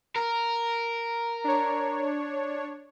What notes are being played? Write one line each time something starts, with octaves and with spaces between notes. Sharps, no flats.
A#4
D4 C#5